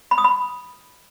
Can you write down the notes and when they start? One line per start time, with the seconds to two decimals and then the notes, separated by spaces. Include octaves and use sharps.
0.11 B5
0.18 D#6
0.24 B5